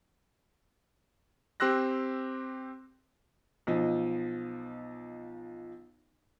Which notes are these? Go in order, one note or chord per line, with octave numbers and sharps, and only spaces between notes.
C4 G4 C6 E6 F#6 A#6
B1 F3 D#5